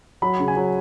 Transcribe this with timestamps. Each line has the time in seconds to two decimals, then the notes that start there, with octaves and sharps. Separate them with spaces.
0.22 F#3 B5
0.39 C#3
0.48 G#5
0.57 F#3